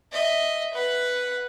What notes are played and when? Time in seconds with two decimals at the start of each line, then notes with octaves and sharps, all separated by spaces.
0.12 D#5 E5
0.73 B4 F#5